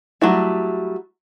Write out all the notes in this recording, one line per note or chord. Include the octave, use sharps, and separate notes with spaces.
F#3 G3 A3 E4